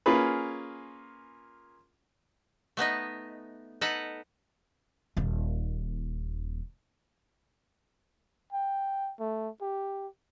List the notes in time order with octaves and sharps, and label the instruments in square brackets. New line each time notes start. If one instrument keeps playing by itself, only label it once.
[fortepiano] A#3 C#4 F4 G#4 B4
[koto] A3 B3 D#4 D#5
D#4 A4 B4 F#5
[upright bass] D#1 D#2
[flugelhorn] G5
A3
G4